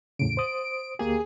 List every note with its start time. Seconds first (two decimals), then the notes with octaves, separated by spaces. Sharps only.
0.19 E2 A2 C#3 D7
0.37 C5 D#6
0.99 D2 A#3 G4 G#4